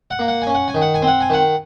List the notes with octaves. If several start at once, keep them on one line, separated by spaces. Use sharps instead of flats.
F#5
A#3
F#5
G#5
C#4
F#5
G#5
D#3
F#5
G#5
C4
F#5
G#5
D#3 F#5